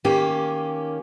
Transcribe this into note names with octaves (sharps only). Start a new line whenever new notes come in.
D#3 A#3 C#4 G4